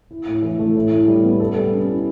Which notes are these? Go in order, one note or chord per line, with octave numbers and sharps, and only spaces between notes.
E4
A2
E3
A3
A2
A2
G3
B3
A4
G3
C#4
E4